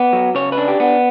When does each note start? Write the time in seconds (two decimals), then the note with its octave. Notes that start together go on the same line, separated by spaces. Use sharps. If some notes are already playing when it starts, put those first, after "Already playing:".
Already playing: B3 D5
0.13 F#3
0.35 C#3 C#5
0.52 B4
0.58 D4
0.68 G4
0.80 B3